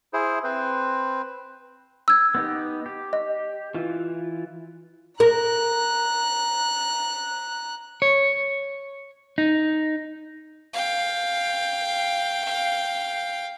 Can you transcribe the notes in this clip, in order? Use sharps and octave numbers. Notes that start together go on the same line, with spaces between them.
E4 G#4 C5
C4 B4 C5
E6 G#6
B3 D#4 G4
G4
D#5
E3 F4
A#4 A#5 F#6
C#5
D#4
F5 G5